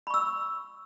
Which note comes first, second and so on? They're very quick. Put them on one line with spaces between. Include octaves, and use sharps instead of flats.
B5 C#6 E6